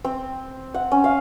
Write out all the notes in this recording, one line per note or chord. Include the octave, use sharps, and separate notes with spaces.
C4
F#5
C#4
F5